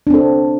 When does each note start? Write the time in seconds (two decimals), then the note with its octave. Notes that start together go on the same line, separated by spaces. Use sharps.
0.07 D4
0.10 C4
0.14 A4